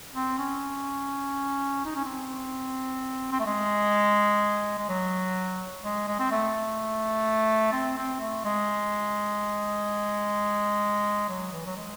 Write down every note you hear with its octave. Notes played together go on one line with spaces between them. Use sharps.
C4
C#4
D#4
C#4
C4
C4
A3
G#3
G#3
F#3
G#3
G#3
C4
A3
C4
C4
A3
G#3
F#3
E3
F#3
G#3